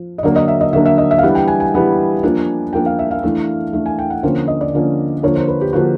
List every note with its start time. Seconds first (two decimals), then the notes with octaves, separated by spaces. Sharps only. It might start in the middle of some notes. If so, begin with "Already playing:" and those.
Already playing: F3
0.18 D#5
0.23 D3 F#3 A#3 D4 D5
0.36 D#5
0.48 E5
0.61 D#5
0.73 D3 F#3 A#3 D4 E5
0.86 E5
0.98 D#5
1.11 E5
1.18 F5
1.23 E3 G3 B3 D4 F#5
1.35 G5
1.48 G#5
1.60 G#5
1.74 E3 G3 B3 D4
2.23 F3 A#3 D4
2.73 F3 A#3 D4 G5
2.86 F5
2.99 E5
3.11 F5
3.23 E3 A3 D4
3.73 E3 A3 D4
3.86 G#5
3.99 G5
4.10 F#5
4.23 D3 F3 A#3 C#4 C5
4.48 D#5
4.61 D5
4.73 D3 F3 A#3 C#4
5.23 D3 F3 A#3 D4 C#5
5.36 C5
5.48 B4
5.61 G4
5.73 D3 F3 A#3 D4 F#4